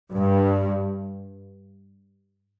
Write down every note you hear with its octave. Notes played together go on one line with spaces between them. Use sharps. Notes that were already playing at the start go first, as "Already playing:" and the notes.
G2